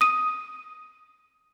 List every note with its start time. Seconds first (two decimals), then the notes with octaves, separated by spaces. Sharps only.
0.01 D#6 D#7